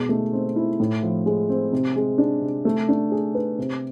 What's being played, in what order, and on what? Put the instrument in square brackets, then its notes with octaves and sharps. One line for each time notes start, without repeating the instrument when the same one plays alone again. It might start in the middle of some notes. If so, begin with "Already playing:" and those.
Already playing: [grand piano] B2 G#3
A3
C4
E4
A2
F3
G#3
C4
C3
G#3
D4
C3
A3
D4
G#4
B4
C3